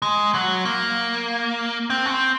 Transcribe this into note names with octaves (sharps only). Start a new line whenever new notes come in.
G#3
F#3
A#3
C4
C#4
C4